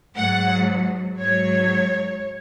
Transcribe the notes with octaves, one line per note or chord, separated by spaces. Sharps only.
G#2 F#3 F#5
G#2 F#3 C#5